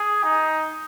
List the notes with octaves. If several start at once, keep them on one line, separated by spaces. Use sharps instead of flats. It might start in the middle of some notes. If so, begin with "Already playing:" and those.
Already playing: G#4
D#4